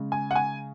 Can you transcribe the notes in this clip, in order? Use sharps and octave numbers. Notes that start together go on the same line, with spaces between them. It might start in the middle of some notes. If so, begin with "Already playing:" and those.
Already playing: C#3 G#3
G#5
F#5
G#5